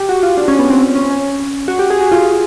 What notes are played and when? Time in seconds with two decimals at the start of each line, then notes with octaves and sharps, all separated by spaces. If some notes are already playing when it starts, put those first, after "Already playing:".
Already playing: G4
0.09 F#4
0.23 F4
0.37 D4
0.48 C#4
0.59 B3
0.70 C4
0.81 C#4
0.95 C#4
1.11 C#4
1.68 F#4
1.79 G4
1.90 G#4
2.01 F#4
2.12 F4